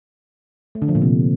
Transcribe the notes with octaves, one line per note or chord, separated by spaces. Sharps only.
A3
D3
F3
A#2
C3